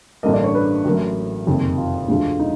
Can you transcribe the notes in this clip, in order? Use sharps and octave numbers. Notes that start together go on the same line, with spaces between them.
A1 G2 D3 G3 A#3 D#5
D5
C#5
B4
A1 A2 F#3 A#4
F#1 F2 C3 D#3
F4
E1 D2 D3 F3 G#3 F4
D#4